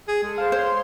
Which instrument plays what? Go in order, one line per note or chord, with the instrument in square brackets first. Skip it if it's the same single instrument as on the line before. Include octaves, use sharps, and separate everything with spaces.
[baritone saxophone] G#4
[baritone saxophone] G#3 [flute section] A4
[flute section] C5 A5 [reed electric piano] F5
[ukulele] C5 [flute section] C#5 C6